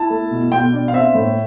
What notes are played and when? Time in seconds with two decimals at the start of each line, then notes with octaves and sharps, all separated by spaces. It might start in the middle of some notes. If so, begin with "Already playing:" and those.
Already playing: E4 A5
0.10 A3
0.31 B2
0.52 B2 G5
0.73 D4
0.88 F5
0.93 C4 E5
1.15 A2